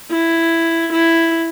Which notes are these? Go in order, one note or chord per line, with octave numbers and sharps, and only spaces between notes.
E4
E4